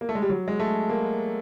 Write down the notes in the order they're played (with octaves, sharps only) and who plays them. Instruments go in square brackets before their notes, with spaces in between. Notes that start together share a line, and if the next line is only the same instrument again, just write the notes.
[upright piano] A#3
A3
G#3
G3
F#3
G#3
A3
A#3